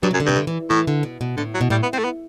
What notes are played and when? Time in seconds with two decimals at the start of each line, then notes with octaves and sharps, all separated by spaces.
0.03 G2 F#3
0.11 C3
0.14 F#2
0.20 D3
0.26 G2 C3
0.36 D3
0.47 E3
0.70 A2 E3
0.87 D3
1.03 B2
1.21 B2
1.37 A2 D3
1.54 F#3
1.61 B2
1.70 A2 G3
1.83 B3
1.93 A2 C4
1.98 A3
2.04 B3